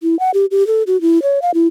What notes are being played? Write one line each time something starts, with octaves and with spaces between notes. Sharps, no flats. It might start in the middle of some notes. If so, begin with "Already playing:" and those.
E4
F#5
G4
G4
A4
F#4
E4
C#5
F5
E4